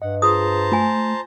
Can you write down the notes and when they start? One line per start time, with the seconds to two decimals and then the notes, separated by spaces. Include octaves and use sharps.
0.02 G2 D#5 F#5
0.22 F4 G#4 C5 A5 A#5 D#6
0.72 A3 F4 G#5